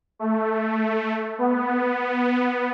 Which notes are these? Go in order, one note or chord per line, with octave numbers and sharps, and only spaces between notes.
A3
B3